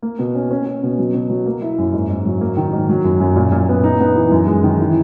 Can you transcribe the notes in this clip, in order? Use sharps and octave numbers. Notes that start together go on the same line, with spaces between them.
A#3
B2
C#4
C#4
C#4
B2
F#3
B2
F#3
A#3
E4
F#2
G#2
G#2
F#3
A#3
D#3
G#2
F#3
F#2
F#2
A#2
A#2
B3
D#4
B3
E3
F#2
G#3
D#3
E3